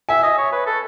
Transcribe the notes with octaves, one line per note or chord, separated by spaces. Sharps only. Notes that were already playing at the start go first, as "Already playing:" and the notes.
E5 G#5
D#5
C#5
B4
A4